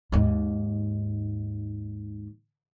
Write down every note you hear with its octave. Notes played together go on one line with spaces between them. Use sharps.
D#2 G#2